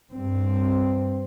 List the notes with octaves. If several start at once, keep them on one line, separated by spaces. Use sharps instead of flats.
G2 C4